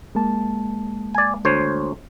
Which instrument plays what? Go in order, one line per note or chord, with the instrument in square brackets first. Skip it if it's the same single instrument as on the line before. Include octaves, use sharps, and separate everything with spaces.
[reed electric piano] G#3 A#3 A5
[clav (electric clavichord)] D5 G#5
D2 C5 C#5